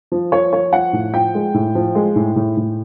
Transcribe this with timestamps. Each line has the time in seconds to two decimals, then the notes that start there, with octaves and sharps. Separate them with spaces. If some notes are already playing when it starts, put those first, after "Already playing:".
0.12 F3
0.32 F3 C#5
0.53 F3 C#5
0.73 F3 F#5
0.93 A2
1.14 F3 G5
1.34 G#3
1.54 A2
1.75 F3
1.95 G#3
2.16 A2
2.36 A2
2.57 A2